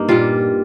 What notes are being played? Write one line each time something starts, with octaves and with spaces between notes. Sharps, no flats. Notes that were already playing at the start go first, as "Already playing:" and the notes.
Already playing: G2 A#3 D#4
A#2 G3 F4